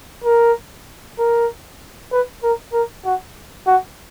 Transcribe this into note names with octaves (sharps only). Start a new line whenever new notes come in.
A#4
A#4
B4
A#4
A#4
F#4
F#4